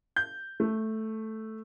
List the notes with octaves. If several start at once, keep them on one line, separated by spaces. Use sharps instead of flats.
G6
A3